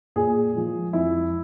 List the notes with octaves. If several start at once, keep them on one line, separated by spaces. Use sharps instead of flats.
A#2 G#4
F3 G#3
F2 E4